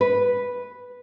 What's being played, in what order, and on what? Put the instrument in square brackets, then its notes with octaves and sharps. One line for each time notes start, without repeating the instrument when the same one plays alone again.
[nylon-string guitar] B4